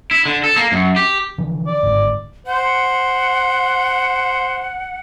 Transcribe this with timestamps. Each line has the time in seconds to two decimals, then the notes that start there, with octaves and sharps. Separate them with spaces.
0.11 E4
0.26 D3
0.44 A4
0.56 A#3
0.72 F#2
0.96 G4
1.38 D3 E3 F3
1.67 D5
1.83 G1 G#2
2.47 C5 F#5